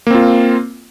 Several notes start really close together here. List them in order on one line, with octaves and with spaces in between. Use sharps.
A#3 C4 F4